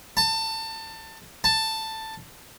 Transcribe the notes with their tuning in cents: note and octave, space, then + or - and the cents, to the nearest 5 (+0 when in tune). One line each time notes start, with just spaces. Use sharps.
A5 +25
A5 +10